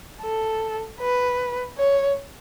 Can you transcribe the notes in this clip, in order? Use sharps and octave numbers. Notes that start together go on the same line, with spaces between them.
A4
B4
C#5